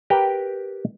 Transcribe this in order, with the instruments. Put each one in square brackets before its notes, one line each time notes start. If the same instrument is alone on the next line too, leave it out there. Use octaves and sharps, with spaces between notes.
[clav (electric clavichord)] G4 A#4 B4 G5